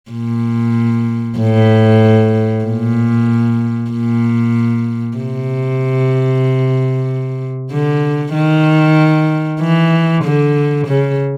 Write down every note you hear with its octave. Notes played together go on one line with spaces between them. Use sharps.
A#2
A2
A#2
A#2
C3
D3
D#3
E3
D3
C#3